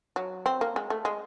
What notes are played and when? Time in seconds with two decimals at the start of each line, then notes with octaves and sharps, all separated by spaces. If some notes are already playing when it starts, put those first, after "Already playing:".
0.16 F#3
0.46 C4
0.61 A#3
0.76 G#3
0.90 A3
1.05 G#3